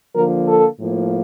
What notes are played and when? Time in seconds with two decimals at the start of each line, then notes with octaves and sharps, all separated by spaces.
0.14 D3 F3 A#3 A#4
0.46 A4
0.79 A2 F3 A#3